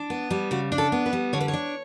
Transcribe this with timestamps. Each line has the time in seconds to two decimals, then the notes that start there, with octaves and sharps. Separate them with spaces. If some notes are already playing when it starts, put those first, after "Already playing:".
Already playing: D4
0.10 B3
0.30 G3
0.51 C#3 F#4
0.72 D4
0.78 A4
0.92 B3
1.06 B4
1.13 G3
1.33 D3 C#5
1.41 B4
1.48 C#5
1.53 D4